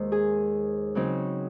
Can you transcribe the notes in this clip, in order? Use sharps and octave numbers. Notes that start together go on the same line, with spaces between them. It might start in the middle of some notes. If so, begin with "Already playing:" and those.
Already playing: D#2 D#3 G#3 C5
G#4
C#3 F#3 C4 D#4